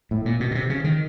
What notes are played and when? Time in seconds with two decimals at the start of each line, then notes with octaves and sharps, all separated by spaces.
0.11 A2
0.25 A#2
0.40 B2
0.51 B2
0.55 C3
0.70 C#3
0.84 D#3